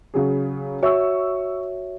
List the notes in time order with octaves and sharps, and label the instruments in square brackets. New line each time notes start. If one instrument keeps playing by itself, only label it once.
[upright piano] C#3 F#3 G#4
[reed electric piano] F#4 C#5 E5 [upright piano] C#6 E6